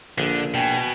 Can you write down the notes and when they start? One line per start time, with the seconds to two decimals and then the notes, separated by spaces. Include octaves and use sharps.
0.18 A#1 D3
0.54 B2 G5 G#5